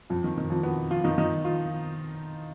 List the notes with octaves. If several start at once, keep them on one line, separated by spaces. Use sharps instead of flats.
F2 F3
D#3
D#3
F2 F3
B2 B3
F3 F4
D#3 D#4
D#3 D#4
F3 F4